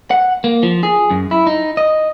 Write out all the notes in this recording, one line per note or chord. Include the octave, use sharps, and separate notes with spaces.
F#5
A#3
F3
G#4
F#2
E4
D#4
D#5